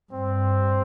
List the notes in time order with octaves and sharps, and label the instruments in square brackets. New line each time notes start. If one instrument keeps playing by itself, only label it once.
[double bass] G2 [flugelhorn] C4